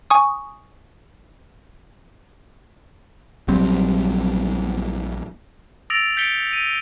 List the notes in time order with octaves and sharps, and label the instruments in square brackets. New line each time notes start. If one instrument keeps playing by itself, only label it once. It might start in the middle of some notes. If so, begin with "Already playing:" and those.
[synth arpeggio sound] G#5 C#6 D#6
[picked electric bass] A#1 F#3 G3 C4
[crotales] D#6 E6 A6 A#6 D7 F7
G6 A6 B6 C#7 D7 G7
D#7